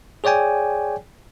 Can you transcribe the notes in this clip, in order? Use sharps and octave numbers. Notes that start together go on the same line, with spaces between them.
G#4 C#5 D5 G5 G#5